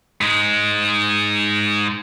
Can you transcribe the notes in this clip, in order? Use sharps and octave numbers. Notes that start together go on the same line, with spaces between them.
G#2 G#3